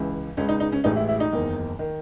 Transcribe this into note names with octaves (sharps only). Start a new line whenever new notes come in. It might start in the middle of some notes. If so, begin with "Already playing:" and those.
Already playing: C#2 C#3 E3
C#2 C#3 G#3 C#4
D#4
D#4
C#4
A1 A2 E3 G#3 D#4
E4
E4
D#4
F#1 E2 D#3
D#3